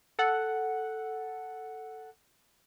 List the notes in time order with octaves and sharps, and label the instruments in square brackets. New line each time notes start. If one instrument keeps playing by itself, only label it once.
[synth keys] A4 F#5